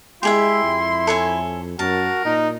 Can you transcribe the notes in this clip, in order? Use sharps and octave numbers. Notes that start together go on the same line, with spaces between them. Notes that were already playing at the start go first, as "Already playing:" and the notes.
G#3 E4 G4 G#4 E5 C6
F2
A4 C#5 G#5
F#2 F#4 A#4 A5
A#2 D#4